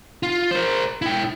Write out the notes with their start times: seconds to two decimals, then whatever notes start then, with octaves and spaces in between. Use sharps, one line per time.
0.23 F4
0.51 A#4 C5
1.02 E4 G5